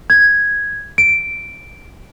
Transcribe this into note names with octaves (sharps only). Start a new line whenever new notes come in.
G#6
D7